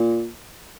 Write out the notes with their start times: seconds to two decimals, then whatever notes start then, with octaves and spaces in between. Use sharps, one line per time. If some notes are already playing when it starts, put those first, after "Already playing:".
Already playing: A#2